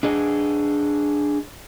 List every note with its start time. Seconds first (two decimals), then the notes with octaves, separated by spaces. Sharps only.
0.03 D4 G#4 D#5